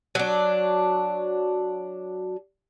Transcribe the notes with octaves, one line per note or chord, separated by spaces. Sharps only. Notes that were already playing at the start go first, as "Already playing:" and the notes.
F#3 D4